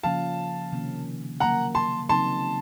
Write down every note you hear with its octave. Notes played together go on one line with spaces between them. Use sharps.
C#3 F3 A#3 C#4 F5 A5
C3 D#3 A#3 C#4
C#3 F#3 A#3 F#5 A#5
A5 C6
C#3 F#3 C4 D#4 A5 C6